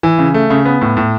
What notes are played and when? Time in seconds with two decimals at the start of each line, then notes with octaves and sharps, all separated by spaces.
0.03 E3
0.19 C#3
0.34 A3
0.50 C#3
0.65 B3
0.81 A2
0.97 A2